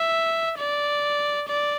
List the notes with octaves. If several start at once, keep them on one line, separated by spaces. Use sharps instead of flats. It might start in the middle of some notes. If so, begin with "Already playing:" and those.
Already playing: E5
D5
D5